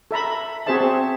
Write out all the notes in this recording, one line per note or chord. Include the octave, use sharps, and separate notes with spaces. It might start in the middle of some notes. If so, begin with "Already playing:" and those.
A4 E5 A#5 B5
B5
C4 F#4 G#4 C5 E5 A5
C4